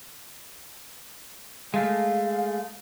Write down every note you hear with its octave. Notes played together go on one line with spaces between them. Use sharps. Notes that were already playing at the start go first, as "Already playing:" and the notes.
G#3 A3 F5